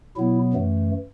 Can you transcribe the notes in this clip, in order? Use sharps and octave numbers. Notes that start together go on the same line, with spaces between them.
B2 F#3 B3 E4
F#2 E3 A3